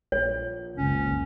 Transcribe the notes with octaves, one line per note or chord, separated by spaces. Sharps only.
A#1 C#5
F#1 C#2 C#4